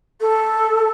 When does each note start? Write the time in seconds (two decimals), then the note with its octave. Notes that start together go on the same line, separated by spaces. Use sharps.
0.21 A4